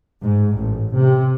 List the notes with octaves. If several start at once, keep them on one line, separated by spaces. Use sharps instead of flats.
G#2
A1
C3